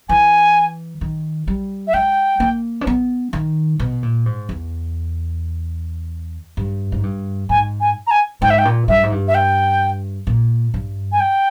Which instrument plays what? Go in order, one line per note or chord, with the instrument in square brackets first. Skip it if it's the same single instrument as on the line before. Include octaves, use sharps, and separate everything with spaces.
[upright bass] E3 [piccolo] G#5
[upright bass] D#3
G3
[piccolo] E5
[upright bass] G#3 [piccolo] G5
[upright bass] A#3
C#4
B3
D#3
B2
A#2
G#2
E2
G2
G#2
G2
[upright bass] G#2 [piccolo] G#5
[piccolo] G#5
A#5
G#5
[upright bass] G#2 [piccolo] G5
[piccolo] E5
G5
[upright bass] A#2
[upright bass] G2 [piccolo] E5
[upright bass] G#2
G2
[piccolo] E5
G5
[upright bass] A#2
G2
[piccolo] G#5
G5